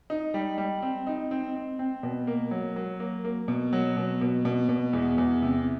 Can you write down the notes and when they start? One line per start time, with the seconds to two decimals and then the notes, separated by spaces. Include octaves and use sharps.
0.10 D#4
0.34 G3
0.58 G3
0.82 C4
1.07 D#4
1.31 C4
1.55 C4
1.79 C4
2.03 B2
2.27 A#3
2.51 F#3
2.76 F#3
3.00 A#3
3.24 A#3
3.48 B2
3.73 F#3
3.97 B2
4.21 B2
4.45 B2
4.69 B2
4.93 E2
5.18 E2
5.42 C3